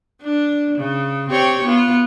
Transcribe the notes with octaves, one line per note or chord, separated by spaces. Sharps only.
D4
C#3
C4 G4 C#5
B3 F4